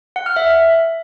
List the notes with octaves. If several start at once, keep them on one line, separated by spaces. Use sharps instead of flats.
F#5
F6
E5